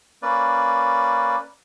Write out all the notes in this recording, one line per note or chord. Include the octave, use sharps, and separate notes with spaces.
A#3 C#4 B4 D5